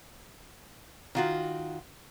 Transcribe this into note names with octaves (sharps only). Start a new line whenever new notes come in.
D#3 F4 F#4